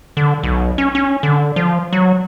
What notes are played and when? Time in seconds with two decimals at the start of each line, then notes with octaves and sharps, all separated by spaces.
0.17 D3
0.43 B1
0.78 C#4
0.95 C#4
1.23 D3
1.56 F3
1.93 F#3